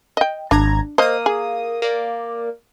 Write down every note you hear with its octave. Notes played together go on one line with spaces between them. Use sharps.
D#5 G5
G#1 D4 A#5 G#6
A#3 C5 D#5 D#6
G#4
A#3 D5